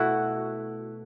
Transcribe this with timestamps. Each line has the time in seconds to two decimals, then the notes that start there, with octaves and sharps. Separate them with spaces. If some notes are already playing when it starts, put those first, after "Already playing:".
Already playing: B2 A3 E4 F#4